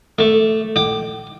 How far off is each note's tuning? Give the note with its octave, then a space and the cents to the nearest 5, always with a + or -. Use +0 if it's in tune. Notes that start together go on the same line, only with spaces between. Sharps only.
A3 +0 D6 +0
G5 -35 D6 +15